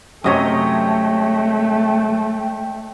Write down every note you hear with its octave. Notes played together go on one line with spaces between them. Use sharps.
F#2 C3 A3 C#5 D#5 G5 D#6